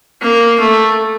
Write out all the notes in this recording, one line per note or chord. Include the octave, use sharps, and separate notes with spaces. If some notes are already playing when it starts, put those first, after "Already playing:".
A#3
A3